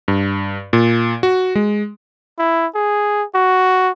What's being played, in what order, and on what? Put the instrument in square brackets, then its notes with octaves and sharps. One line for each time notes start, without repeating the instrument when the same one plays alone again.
[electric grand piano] G2
A#2
F#4
G#3
[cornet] E4
G#4
F#4